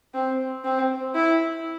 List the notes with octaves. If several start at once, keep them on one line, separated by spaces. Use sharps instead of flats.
C4
C4
E4